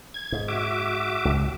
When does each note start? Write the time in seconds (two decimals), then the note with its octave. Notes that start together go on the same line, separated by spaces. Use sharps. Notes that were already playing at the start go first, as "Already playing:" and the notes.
0.14 G#6
0.32 G#2
0.48 F#4 E5 D6
1.25 C#2